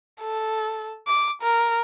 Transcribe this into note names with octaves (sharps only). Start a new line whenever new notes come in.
A4
D6
A#4